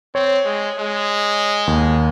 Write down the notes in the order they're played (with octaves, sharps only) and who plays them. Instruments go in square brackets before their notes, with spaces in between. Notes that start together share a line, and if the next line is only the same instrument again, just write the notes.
[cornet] C4 [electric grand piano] C#5
[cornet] G#3
G#3
[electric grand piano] D#2